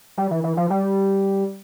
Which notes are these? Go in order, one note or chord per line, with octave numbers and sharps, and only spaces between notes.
G3
E3
E3
F3
G3